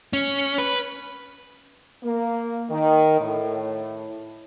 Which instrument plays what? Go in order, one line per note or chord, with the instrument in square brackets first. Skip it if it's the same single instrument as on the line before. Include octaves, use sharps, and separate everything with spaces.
[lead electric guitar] C#4
B4
[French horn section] A#3
D#3
A2